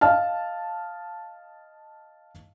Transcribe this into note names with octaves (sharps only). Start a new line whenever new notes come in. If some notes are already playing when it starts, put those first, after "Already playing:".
D#5 F5 A5 F6